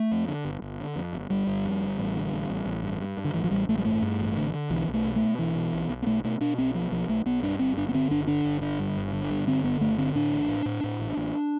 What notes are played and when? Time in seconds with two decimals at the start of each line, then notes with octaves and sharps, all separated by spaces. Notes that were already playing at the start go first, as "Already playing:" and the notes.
Already playing: A3
0.11 F2
0.28 D3
0.45 G1
0.62 G1
0.80 D3
0.96 F2
1.13 G1
1.30 G1 G3
1.47 G1
1.64 F2
1.82 G1
1.98 A1
2.15 D3
2.32 A1
2.50 A1
2.66 A1
2.83 G2
3.00 G2
3.17 G2
3.25 D3
3.34 A1 E3
3.44 F3
3.51 A1 G3
3.69 A1 A3
3.78 G3
3.85 G2 A3
4.02 G2
4.19 A1
4.37 D3
4.54 D3
4.70 B1 E3
4.88 B1
4.93 A3
5.05 B2
5.16 A3
5.22 B2
5.39 B1 E3
5.55 B2
5.73 B1
5.89 B1
6.02 B3
6.06 B2 A3
6.24 B2 A3
6.40 B2 D4
6.58 B1 C4
6.74 B2 F3
6.91 B1 F3
7.09 B1 A3
7.25 B1 B3
7.43 G2 D4
7.59 G1 C4
7.77 G1 D4
7.89 B3
7.94 D3 C4
8.10 G1 D4
8.27 D3 D4
8.45 G1
8.61 D3
8.79 G2
8.97 G1
9.12 D3
9.30 G2
9.47 D3 C4
9.64 G1 B3
9.80 G1 A3
9.98 D3 C4
10.15 A2 D4
10.32 A1
10.49 A2
10.66 A2
10.84 A2
11.00 A1
11.17 A1